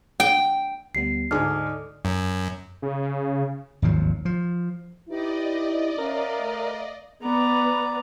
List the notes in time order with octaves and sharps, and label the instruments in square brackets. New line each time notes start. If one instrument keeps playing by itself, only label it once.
[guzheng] G5
[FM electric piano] D2 G3 B3 [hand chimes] C7
[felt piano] D2 G#2 G#4 [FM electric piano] A4 D5 D#5 [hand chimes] F6
[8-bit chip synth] F#2
[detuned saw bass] C#3
[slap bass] G#1 D#2 F3 F#3
F3
[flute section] D#4 G4 B4 [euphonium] E4 [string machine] D5 D#5
[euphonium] C#4 [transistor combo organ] A#4 [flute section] E5 F5
[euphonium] A3
[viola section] B3 B4 [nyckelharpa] D5 A#5